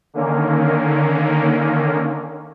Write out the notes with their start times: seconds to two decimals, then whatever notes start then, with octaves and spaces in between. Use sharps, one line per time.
0.14 D3 D#3 A#3 C#4